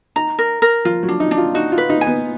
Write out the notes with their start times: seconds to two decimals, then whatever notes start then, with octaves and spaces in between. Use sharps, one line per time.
0.16 D#4 A#5
0.39 A#4
0.62 A#4
0.85 F3 F4
1.03 F#3
1.08 D4
1.20 D#4
1.31 D4
1.37 F4
1.55 D#4 F#4
1.72 F4
1.78 B4
1.90 D#4
2.01 G#5
2.07 B3